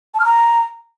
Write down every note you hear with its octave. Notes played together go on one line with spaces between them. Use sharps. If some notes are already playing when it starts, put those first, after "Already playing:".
A5
F6
A#5